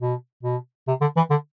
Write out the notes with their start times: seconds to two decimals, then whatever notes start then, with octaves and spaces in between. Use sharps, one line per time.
0.01 B2
0.43 B2
0.88 C3
1.01 D3
1.17 E3
1.31 D3